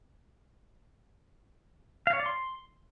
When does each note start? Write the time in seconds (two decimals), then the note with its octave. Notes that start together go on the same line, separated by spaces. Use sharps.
2.07 F5
2.13 C#5
2.20 D5
2.26 C6